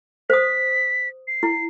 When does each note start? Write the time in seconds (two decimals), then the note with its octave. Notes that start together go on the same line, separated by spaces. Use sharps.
0.30 C5 D#6 B6
1.27 C7
1.43 E4